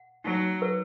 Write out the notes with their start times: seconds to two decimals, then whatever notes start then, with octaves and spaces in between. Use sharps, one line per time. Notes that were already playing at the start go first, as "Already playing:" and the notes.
Already playing: F#5
0.24 F#3 D#4
0.62 B4